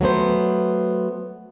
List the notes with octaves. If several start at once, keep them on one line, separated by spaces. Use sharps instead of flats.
F#3 A3 B3 C5